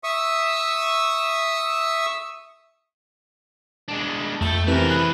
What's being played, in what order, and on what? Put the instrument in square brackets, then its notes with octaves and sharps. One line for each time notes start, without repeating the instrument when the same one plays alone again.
[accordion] E5 C#6 D#6 E6
[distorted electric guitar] G#3 D4
[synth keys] F2 A5 G6 [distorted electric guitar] A3
[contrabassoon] C3 [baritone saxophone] E3 [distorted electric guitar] A3 A#4
[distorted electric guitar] G#4 B4 [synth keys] F#6